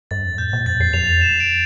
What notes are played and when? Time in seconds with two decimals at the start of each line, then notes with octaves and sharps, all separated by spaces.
0.11 G2 A6
0.25 F2
0.38 A2 G6
0.53 A#2
0.66 F2 A6
0.80 F2 C7
0.93 F2 F7
1.07 E2 F7
1.21 F2 E7
1.40 D7